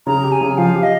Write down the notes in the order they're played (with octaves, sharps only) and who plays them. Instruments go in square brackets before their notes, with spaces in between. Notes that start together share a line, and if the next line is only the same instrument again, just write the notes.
[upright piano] C#3 [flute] A#5
[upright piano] G4
[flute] G#5
[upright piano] C#3
[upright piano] F3 [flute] F5
[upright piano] G4
[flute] D#5